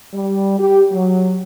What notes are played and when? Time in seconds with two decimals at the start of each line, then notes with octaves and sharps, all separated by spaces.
0.14 G3
0.59 G4
0.92 F#3